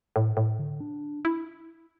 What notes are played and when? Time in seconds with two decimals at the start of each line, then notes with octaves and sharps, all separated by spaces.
0.16 A2
0.37 A2
0.59 D3
0.81 D4
1.25 E4